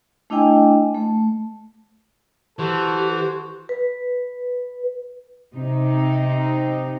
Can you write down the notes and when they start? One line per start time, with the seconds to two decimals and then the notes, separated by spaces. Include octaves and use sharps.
0.30 A3 D4 E4 D#5 G5 G#5
0.94 A3
2.59 E3 F#4 G4 A4 C5
3.69 B4
5.55 C3 D#4